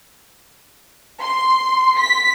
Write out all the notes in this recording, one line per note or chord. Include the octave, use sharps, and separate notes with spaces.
C6
B6